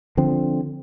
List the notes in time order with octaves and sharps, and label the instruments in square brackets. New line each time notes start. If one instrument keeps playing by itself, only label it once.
[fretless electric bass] D3 F3 C4